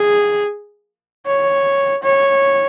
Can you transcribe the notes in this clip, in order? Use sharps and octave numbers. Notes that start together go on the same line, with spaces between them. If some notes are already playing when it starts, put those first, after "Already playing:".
Already playing: G#4
C#5
C#5